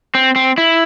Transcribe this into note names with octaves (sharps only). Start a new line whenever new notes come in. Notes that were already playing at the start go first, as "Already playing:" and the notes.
C4
C4
E4